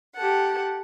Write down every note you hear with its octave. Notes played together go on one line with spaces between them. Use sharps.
G4 A4 F#5